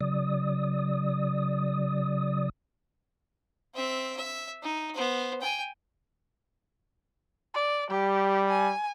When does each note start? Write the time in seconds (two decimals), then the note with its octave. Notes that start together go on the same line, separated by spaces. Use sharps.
0.01 C#3 F#3 D5 D#6
3.75 C4 E5
4.17 E5
4.62 D#4
4.94 B3 C5
5.41 G5 G#5
7.54 D5
7.90 G3 G4
8.49 G#5